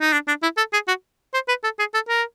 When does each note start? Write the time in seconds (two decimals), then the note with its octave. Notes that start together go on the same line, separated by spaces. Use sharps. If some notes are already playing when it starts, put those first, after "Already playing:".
0.01 D#4
0.12 D4
0.28 D4
0.43 E4
0.57 A4
0.73 G#4
0.88 F#4
1.34 C5
1.48 B4
1.64 A4
1.79 G#4
1.94 A4
2.09 A#4